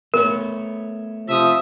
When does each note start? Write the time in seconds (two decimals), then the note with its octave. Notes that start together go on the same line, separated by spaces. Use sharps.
0.14 A3 B3 A#4 C#5
1.29 C3 F3 E5 D#6